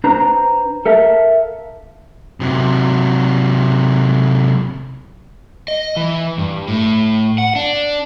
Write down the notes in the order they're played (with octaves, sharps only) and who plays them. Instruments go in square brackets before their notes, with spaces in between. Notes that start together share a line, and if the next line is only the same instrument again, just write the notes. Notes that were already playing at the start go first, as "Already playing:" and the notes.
[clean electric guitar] D4 B4 C5 A#5
A4 A#4 E5 F5 A5
[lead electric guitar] C3 F#3
[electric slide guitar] D#5
E3
G2
A2
F#5
D4